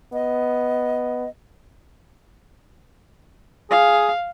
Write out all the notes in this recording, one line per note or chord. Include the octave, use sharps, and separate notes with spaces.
B3 D#5
G#4 F5